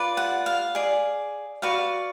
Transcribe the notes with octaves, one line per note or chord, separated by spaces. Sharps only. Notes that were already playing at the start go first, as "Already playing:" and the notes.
Already playing: F4 B4 D5
F#5
F5
G#4 D5
F#4 B4 D5 F5